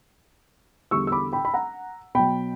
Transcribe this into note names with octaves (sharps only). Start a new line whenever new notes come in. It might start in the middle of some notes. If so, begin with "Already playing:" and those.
E2 D3 G3 C#6 E6
E6
B5 D6
G5 B5
B5
F#5 A#5
B2 F#3 G5 B5